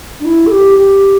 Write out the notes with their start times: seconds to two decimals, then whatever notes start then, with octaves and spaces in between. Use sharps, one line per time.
0.19 D4
0.24 E4
0.46 A4
0.51 G4
0.78 G4